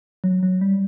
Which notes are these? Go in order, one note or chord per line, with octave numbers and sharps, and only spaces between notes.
F#3
F#3
G3